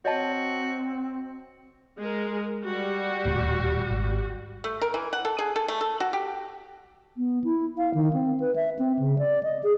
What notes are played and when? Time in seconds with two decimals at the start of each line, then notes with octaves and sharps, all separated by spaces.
0.05 C4 F#4 C#5 D#5 A5
1.99 G#3 G#4 A#4
2.63 G3 F#4
3.25 D#1 D2 A2
3.91 G#1
4.64 A3
4.81 A#4
4.94 E3
5.13 F#5
5.25 A4
5.39 G#4
5.56 A4
5.68 A3
5.81 A4
6.00 F#4
6.13 G4
7.17 B3
7.44 E4
7.78 F5
7.94 D#3
8.13 C4
8.40 B4
8.56 E5
8.79 C4
8.99 C#3
9.18 D5
9.43 D#5
9.63 G#4